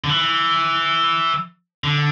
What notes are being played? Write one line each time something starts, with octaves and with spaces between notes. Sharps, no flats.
D3
E3
D3